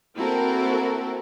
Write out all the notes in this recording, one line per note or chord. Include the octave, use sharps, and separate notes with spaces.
A#3 C4 E4 F#4 A4 A#4